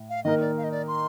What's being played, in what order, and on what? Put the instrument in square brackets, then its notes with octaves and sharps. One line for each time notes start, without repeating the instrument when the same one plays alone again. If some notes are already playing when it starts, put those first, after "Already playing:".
Already playing: [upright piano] A2
[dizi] F5
[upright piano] D#3 A#3 D#4 A#4 [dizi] D#5
[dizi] D5
F5
D#5
D5
C6